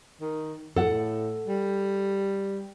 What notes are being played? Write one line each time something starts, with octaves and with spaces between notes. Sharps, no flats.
D#3
A2 A4 F#5
G3